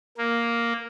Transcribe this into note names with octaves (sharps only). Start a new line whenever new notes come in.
A#3